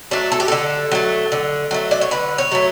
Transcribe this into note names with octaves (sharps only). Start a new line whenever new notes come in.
F#3 A3 D4
A4
G4
D3 A4
F#3 A3
D3
F#3 A3
D5
C#5
D3 B4
C#5
F#3 A3